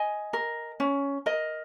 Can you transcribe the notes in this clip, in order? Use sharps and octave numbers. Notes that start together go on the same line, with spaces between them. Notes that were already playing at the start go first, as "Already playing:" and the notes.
Already playing: D#5 G#5
A#4
C#4
A#4 D#5